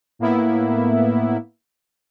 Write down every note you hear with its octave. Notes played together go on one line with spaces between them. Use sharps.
A2 A#3 B3 E4